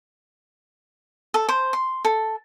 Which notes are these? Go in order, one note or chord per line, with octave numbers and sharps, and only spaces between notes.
A4
C5
C6
A4